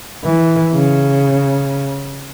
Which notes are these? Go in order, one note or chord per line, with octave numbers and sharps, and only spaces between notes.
E3
C#3